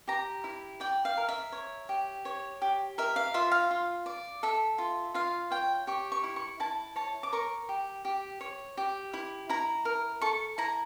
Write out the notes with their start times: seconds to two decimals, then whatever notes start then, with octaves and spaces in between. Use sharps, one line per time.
0.08 G4 A#5
0.44 E4
0.80 D5 G5
1.05 F5
1.17 A#4
1.29 E5
1.52 C#5
1.89 G4
2.25 C#5
2.62 G4
2.98 A#4 E5
3.16 F5
3.34 F4 E5
3.52 F5
3.71 F4
4.06 D5
4.43 A4 E5
4.78 F4
5.14 F4 F5
5.51 C#5 G5
5.87 G4 C#6
6.12 C#6
6.23 E4
6.36 C#6
6.60 E4 A5
6.96 C#5 A5
7.23 D6
7.33 A#4 C#6
7.69 G4
8.05 G4
8.41 C#5
8.77 G4
9.13 E4
9.49 E4 A#5
9.85 A#4
10.21 A4 C#6
10.58 E4 A#5